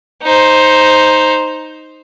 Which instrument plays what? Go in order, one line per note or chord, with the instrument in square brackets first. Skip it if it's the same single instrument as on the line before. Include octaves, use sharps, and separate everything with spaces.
[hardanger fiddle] D#4 C5